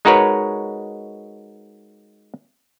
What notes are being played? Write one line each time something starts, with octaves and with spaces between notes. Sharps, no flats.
G#3 D#4 F#4 A#4 B4 C#5